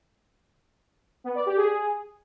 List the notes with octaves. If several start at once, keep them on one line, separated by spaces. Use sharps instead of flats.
B3
D5
G4
G#4